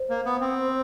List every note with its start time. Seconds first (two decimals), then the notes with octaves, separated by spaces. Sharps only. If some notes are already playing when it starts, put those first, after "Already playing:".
Already playing: C5
0.10 A#3
0.25 B3
0.41 C4